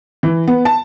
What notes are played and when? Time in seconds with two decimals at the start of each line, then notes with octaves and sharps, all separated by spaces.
0.23 E3
0.47 B3
0.65 A5